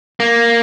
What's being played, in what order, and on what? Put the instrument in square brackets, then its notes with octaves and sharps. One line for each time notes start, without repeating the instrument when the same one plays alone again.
[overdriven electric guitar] A#3